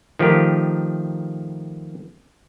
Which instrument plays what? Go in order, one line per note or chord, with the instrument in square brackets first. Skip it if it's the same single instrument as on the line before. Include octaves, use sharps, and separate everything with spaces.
[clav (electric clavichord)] D#3 F3 A3 G4 A#4